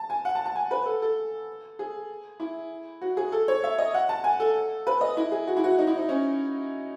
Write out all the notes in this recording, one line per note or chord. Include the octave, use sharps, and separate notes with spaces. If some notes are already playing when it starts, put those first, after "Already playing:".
Already playing: A5
G#5
F#5
A5
A5
G#5
B4
A4
A4
G#4
E4
F#4
G#4
A4
C#5
E5
D#5
F#5
A5
G#5
A4
B4
D#5
E4
G#4
F#4
E4
F#4
D#4
E4
D#4
C#4